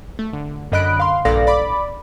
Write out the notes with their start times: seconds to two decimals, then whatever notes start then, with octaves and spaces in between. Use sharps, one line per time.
0.19 A3
0.33 D3
0.72 F#2 D3 D#5 B5 F#6 D7
1.00 F5 C6
1.25 A#1 G2 A4 D5 F5 A#6
1.47 D5 B5 D6